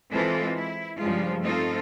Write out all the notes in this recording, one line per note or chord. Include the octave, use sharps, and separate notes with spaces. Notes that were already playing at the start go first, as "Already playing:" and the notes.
E3 G#3 C4 E4 F4 A4
E4
G2 C#3 F3 G3 G#3 F4
A3 C4 D#4 F4 A4